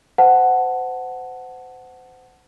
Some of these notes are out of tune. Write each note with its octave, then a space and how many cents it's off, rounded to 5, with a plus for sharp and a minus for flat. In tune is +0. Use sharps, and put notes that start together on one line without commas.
C5 -30 F#5 +0 A5 +0